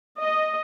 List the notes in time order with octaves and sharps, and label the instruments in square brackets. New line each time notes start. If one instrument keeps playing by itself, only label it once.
[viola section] D#5